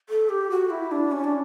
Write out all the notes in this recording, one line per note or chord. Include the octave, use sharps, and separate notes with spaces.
A4
G4
F#4
E4
D4
C#4
D4